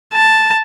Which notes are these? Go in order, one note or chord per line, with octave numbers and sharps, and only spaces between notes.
A5